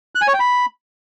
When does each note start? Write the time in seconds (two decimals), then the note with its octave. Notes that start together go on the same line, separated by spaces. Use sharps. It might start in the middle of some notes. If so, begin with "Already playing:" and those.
0.15 F#6
0.21 G#5
0.27 C#5
0.34 G5
0.40 B5